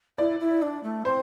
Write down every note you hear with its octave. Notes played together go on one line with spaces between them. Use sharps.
E4 D5
E4
D4
A3
C4 C5